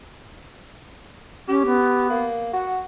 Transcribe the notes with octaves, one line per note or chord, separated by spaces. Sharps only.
C#4 G4
B3
A#3
F#4 F#5